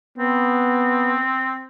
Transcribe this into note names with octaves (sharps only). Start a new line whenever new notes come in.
B3 C4